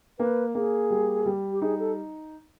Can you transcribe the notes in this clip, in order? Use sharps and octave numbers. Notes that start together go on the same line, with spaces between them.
A#3 B4
A#3 G#4
G3
G3
G4
D#4 G#4
A4